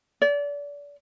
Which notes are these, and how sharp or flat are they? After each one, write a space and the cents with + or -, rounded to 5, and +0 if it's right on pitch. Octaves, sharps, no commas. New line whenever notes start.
D5 -30